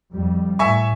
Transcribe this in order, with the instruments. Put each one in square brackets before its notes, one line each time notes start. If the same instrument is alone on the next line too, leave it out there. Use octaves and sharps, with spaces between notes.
[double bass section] F2 G3
[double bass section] A2 [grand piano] E5 G#5 C#6